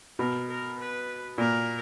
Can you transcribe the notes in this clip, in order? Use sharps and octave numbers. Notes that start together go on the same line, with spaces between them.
B2 A#4
A#4
B4
A#2 A#4